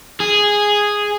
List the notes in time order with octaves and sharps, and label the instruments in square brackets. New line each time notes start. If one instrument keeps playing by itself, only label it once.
[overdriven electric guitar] G#4